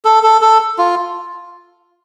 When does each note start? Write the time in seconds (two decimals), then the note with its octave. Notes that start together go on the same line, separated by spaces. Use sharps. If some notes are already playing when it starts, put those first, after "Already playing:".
0.05 A4
0.23 A4
0.41 A4
0.78 F4